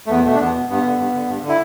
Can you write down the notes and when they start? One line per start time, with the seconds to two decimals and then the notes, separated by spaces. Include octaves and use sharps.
0.06 A3
0.10 E2 B3
0.25 B2 A3
0.34 D4
0.40 E2 B3
0.55 B2
0.69 G2 B3
0.84 D3
0.98 G2
1.14 D3
1.28 G2
1.42 D3
1.48 E4